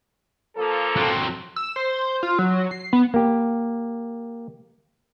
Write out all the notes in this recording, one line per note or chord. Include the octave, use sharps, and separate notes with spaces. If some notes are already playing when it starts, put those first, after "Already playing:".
F3 A#3 A4
F#3 C4
E6
C5
F4
F#3
C7
B3
A#3 G4